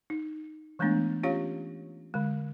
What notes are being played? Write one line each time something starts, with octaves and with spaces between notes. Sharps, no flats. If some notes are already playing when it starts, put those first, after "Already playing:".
D#4
E3 G#3 A3 B3 D4
C#4 F4 G4 C#5 F5
D3 G#3